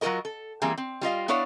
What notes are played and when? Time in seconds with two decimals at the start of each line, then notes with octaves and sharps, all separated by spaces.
0.01 F#3 F4 F#4 G#4 A#4 D#5
0.25 A4
0.62 E3 G3 A#3 C4 G#4
0.78 C4
1.01 G3 F4 D#5 F5
1.28 B3 D4 E4 C#5 D5 F5